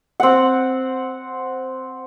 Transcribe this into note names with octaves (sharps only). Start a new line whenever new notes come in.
C4 F#5